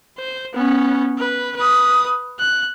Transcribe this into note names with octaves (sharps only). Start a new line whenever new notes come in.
C5
B3 C#4
B4
B4 D#6
F#6